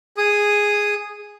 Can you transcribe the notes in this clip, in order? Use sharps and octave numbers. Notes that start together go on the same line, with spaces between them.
G#4 D#6